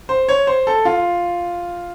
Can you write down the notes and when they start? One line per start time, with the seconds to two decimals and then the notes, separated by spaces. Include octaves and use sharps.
0.09 C5
0.29 C#5
0.47 C5
0.67 A4
0.85 F4